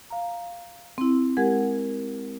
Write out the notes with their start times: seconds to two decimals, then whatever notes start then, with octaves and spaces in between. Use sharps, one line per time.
0.10 F5 A#5
0.98 C4 E4
1.37 G#3 G4 A#4 F#5 G#6